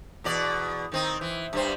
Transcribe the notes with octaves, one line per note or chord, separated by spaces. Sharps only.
E2 B2 D5
D#3 C4 D#4
E3
G2 G3 C5